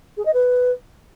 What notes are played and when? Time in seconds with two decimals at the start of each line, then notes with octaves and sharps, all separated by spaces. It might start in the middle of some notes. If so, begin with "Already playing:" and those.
0.17 G#4
0.25 D#5
0.33 B4